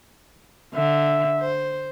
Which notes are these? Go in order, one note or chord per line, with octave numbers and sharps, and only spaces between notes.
D3 E5
C5